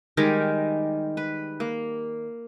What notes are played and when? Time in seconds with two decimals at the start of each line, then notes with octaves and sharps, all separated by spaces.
0.17 D#3 G3 G#3 A#4
1.17 B4
1.60 A#3